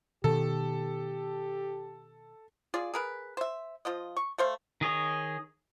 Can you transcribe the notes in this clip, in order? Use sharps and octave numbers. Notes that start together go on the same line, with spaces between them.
B2 D#3 G4 A4
F4 G#4 D5
G#4 A#4 B4
C5 E5
F3 F4 D#5
C#6
A3 C5 F5
D#3 G#4 C#5 D#5